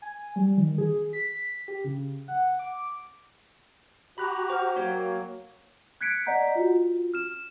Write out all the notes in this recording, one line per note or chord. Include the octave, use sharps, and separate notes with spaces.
G#5
G3
D#3
G#4
B6
G4
C#3
F#5
D6
F#4 G4 A#5 B5 F#6
C5 F#5 F6
F#3 A#3 F#4 C#5 G5
F#6 G#6 B6 C#7 D7
D5 D#5 F#5 A#5 G6 B6
F4 F#4
F6 E7